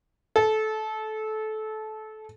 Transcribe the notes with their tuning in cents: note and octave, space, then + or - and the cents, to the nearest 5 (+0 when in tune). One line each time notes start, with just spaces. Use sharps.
A4 -20